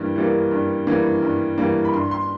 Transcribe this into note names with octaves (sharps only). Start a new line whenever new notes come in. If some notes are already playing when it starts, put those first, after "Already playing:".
Already playing: G2 E3 G3 A#3
E3 G3 A#3
G2
E3 G3 A#3
G2
E3 G3 A#3
B5
G2 C6
C6